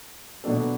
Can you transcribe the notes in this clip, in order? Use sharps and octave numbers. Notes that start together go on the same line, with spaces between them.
B2 F#3 B3 D4 A4